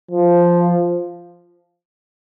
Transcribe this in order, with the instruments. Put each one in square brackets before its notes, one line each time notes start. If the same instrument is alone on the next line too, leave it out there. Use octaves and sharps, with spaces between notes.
[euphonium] F3